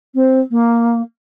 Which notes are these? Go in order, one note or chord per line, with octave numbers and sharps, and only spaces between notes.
C4
A#3